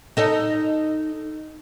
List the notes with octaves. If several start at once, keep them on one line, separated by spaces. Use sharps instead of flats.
D#4 A4 D#5